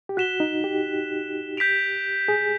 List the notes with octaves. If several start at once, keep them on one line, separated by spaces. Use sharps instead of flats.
G4
F#4 F#6 B6 E7 G7
D#4
G4
G6 B6 D7 F7
G#4